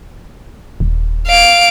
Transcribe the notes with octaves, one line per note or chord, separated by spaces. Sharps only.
D#1
F5 D7